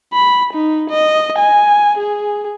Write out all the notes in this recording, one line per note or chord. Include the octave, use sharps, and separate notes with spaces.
B5
D#4
D#5
G#5
G#4